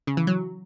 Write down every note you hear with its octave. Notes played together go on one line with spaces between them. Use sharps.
C#3
E3
F#3